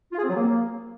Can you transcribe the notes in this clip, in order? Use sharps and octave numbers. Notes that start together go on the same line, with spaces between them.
F4
G#4
C4
F#3
A#3